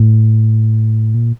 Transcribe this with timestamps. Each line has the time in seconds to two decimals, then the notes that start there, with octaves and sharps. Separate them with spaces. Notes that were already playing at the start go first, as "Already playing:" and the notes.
Already playing: A2
1.15 A#2